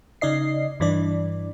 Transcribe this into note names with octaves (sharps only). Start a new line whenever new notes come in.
C#3 D#4 D5 D#5 C7
G2 E3 D4 D5